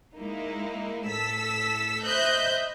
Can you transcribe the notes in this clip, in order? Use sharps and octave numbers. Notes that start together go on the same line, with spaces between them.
G#3 A#3 D#4 E4
A2 A4 E6 B6
C5 D#5 E5 B5 F#6 G6